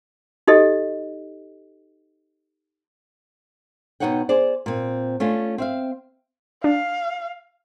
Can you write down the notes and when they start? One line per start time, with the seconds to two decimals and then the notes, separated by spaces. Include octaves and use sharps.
0.47 D#4 G4 A4 D#5
4.00 B2 G#3 D#4 C#5 F#5 G5
4.29 G#4 C5 D5
4.66 A#2 C4
5.20 A3 C#4 D4 F4
5.58 C4 E5 F5
6.64 D4 F5